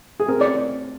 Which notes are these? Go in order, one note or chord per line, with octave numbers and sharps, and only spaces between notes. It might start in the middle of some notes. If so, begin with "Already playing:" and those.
G#4
C4 A#4
D5